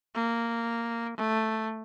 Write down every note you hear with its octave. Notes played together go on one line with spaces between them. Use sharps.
A#3
A3